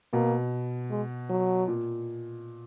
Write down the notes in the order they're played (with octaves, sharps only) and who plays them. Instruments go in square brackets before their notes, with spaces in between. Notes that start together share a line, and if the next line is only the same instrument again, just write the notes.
[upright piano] B2 [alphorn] A#3
[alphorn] G#3
F#3
[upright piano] A#2